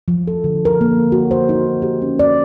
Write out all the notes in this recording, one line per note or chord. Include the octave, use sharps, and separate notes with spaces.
F3
A4
D3
A#4
A#3
F#4
C5
D#4
G4
C#4
D5